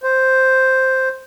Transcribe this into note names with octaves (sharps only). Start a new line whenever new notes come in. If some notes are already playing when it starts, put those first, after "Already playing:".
C5